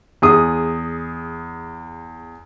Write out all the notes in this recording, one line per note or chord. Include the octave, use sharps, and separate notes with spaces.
E2 G#4 D#6